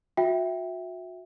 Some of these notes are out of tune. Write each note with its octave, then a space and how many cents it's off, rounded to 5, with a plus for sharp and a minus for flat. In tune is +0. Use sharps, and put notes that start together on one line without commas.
F#4 -35 E5 +0 G5 +0